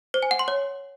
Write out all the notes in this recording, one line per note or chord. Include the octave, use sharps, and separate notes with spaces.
C5
G#5
F#5
C6
C#5